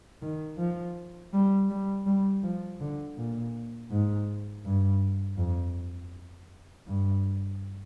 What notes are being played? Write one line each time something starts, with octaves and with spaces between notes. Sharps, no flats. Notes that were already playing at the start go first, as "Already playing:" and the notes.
D#3
F3
G3
G3
G3
F3
D3
A#2
G#2
G2
F2
G2